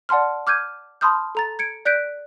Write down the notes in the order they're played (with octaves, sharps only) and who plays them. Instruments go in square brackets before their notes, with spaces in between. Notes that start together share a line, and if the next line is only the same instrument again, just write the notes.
[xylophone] D5 F#5 A5 C6 F6
D6 F6 G6 G#6 D#7
A5 B5 C6 D#6 F6 G6
A4 A#5 A6
G#6 C#7 D7
D5 F#6 G6 B6 D7